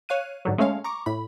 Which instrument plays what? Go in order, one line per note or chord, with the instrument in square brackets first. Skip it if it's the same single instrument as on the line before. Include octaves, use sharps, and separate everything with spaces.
[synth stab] C#5 F5 F#6 D#7
G#2 D3 F#3
G#3 A3 C#4 C#5 F5
A#5 C#6 D6
A2 B5